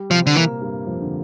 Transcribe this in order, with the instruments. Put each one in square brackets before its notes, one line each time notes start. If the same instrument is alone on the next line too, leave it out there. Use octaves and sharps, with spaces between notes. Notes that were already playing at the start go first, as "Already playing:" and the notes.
Already playing: [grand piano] G3 G4
[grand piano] C3 C4 [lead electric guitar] F3
[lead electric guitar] D3
[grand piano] A#2 A#3 [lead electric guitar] E3
[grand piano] G2 G3
F2 F3
D3